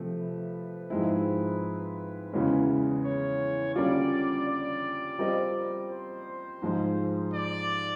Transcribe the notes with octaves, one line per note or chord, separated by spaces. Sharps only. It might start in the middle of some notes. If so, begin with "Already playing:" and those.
Already playing: C3 F3 A3
B4
G#2 F3 G#3 C4 E4
E2 C#3 E3 G#3 C#4
C#5
D3 G3 A#3 C#4 F4 D5
D5
G3 C4 F4 A#4 D#5
C5
G#2 F3 G#3
D5